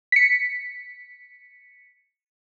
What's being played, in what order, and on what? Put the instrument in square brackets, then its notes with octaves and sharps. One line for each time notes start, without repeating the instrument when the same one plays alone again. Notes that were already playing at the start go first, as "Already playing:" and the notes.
[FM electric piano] B6 C#7